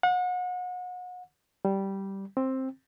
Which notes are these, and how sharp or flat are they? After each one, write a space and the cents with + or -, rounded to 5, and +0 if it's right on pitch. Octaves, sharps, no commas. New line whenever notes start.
F#5 -35
G3 -10
C4 +10